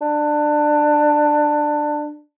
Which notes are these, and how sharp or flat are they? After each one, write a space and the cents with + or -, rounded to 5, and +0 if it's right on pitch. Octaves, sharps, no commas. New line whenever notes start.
D4 +20